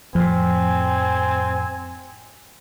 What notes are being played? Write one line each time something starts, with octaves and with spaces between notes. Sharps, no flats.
F2 A2 F3 C4 G#5